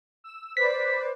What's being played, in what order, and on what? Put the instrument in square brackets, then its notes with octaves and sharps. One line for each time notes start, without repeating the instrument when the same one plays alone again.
[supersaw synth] E6
[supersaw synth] B4 D5 [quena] C5 [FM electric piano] B6